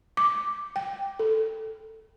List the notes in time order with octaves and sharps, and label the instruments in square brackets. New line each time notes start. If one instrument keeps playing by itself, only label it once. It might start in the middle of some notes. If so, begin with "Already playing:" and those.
[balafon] D6
G5
A4